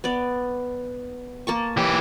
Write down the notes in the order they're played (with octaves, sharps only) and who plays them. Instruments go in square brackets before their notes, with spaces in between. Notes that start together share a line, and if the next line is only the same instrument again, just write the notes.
[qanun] B3 D5
A#3 A5 C#6
[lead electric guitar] E3 G4